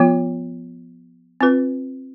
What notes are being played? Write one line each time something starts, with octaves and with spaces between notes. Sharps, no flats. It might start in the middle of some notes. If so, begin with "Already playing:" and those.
Already playing: F3 B3 F4
C4 F4 B4